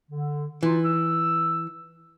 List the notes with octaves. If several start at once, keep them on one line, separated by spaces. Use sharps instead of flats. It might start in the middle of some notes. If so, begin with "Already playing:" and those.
D3
E3 D#4 F4
E6